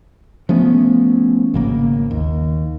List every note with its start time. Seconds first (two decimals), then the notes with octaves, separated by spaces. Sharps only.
0.49 F3 A3 B3 C#4
1.54 G#1 C#3 A#3
2.11 D#2